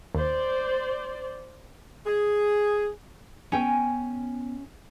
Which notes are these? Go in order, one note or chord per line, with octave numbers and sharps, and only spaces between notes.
D#2 C5 D5
G#4
B3 C#4 G5 G#5